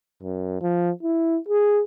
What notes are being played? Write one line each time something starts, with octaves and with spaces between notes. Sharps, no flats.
F#2
F3
E4
G#4